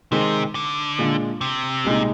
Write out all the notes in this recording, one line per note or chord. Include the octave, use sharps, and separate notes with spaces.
C3 D#3 G#3 C4
D3
A#2 G#3 D4 F4
C3
C2 A#2 G#3 D#4